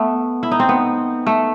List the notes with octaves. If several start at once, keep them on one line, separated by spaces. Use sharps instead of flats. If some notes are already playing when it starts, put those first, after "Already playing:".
Already playing: A3 B3
E4
D#4
C4
B3
A3